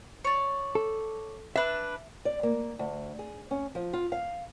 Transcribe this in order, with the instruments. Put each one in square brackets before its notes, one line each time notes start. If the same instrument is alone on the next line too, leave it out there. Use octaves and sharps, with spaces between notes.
[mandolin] C#5 D5
[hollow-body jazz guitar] A4
[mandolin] D4 B4 [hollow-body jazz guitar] E5
[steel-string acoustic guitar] D5
A#3
D2
G#4
C#4
F3
F4
F5